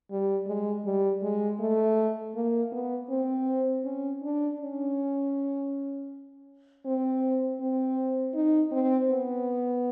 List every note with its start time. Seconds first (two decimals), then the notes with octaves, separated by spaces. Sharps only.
0.11 G3
0.47 G#3
0.85 G3
1.23 G#3
1.60 A3
2.36 A#3
2.72 B3
3.10 C4
3.85 C#4
4.23 D4
4.60 C#4
6.86 C4
7.60 C4
8.35 D#4
8.72 C4
9.10 B3